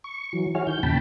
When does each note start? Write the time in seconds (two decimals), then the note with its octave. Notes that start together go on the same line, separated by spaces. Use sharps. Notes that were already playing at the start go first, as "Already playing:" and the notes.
0.04 C#6
0.33 E3 F#3
0.55 E4 F#4 G#4 C#5 F6
0.67 D#3 G6
0.83 E2 A#2 C#3 G5 A5 B5